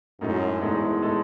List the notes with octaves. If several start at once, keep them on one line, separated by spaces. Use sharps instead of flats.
F#2 A2 G#3 D#4 A4
E2 A2 G#3 D#4 A4
A2 G#3 D#4 A4